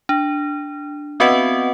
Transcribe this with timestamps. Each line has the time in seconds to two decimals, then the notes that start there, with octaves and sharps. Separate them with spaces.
0.09 D4
1.20 B3 C4 F#4 B4 D#5 F#5